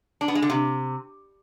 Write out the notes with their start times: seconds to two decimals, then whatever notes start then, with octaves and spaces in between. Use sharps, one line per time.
0.21 D4
0.28 B3
0.35 G#3
0.42 D3
0.50 C3